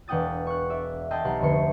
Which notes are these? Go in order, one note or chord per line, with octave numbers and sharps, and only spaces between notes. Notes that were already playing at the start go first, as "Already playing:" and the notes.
E1 D4 F#5 G5 D#6 A6
C#6 F#6
D5 E5
D#5 E5 F#5 G5 A5 C6
B1 G4 F#5 C6
F1 D2 B3 C#5 C6 C#7